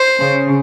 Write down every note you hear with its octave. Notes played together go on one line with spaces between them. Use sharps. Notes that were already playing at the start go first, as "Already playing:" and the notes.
Already playing: C5
C#3